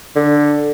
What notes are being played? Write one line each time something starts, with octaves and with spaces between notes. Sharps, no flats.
D3